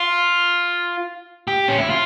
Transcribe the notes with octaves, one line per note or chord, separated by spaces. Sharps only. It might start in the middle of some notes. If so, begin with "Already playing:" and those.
Already playing: F4
G4
C#4
E4
F4